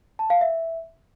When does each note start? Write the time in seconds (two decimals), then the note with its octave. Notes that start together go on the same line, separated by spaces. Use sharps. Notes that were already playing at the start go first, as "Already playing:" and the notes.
0.19 A5
0.30 F5
0.41 E5